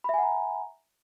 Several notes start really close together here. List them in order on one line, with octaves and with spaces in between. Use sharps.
B5 E5 G#5 F#5 A#5